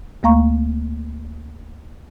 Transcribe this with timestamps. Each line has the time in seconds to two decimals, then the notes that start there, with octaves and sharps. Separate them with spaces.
0.23 D2 A3 A#3 F5 A#5 C#6